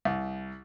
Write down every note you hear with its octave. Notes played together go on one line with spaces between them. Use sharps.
C2